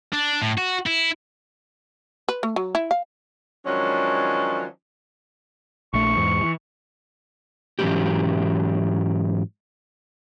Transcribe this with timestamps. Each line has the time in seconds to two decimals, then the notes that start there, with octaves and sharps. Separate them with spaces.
0.13 D4
0.42 A2
0.58 F#4
0.86 E4
2.29 B4
2.43 A3
2.56 F#3
2.75 E4
2.91 F5
3.66 D#3 F3 F#3 G#3 C#4 D4
5.93 A#1 A3 C#6
6.16 E2 G#2
6.41 E3
7.79 G#2 E3 F#3 A3 C#4 G4